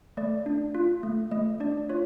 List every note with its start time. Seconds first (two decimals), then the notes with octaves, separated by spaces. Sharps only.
0.17 A3 D5
0.46 D4
0.75 F4
1.03 A3
1.31 A3 D#5
1.60 D4 D5
1.89 F4 C#5